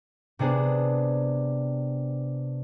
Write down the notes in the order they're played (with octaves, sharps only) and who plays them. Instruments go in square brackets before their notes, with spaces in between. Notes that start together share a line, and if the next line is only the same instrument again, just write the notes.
[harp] C3 B3 D4 G#4